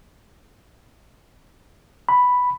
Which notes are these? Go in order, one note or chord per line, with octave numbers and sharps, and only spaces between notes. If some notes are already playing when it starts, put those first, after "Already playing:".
B5